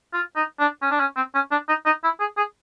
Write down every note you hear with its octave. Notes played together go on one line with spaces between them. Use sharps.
F4
D#4
D4
C#4
D4
C#4
C4
C#4
D4
D#4
D#4
E4
G#4
G#4